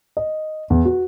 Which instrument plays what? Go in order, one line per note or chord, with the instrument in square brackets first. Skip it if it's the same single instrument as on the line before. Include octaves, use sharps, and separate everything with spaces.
[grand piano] D#5
E2
F#4